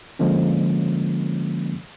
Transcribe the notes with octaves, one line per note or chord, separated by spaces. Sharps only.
D3 F3 G#3 A#3 C#4